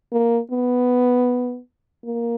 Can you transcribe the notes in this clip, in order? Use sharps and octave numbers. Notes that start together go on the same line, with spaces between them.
A#3
B3
A#3